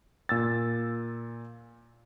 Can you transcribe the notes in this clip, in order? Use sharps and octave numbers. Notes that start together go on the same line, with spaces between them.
A#2 E6 A6